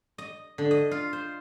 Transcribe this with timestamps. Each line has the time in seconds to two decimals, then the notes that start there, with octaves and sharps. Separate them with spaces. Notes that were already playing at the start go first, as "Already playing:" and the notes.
0.18 D#5
0.58 D3
0.71 D#5
0.91 F4
1.13 C5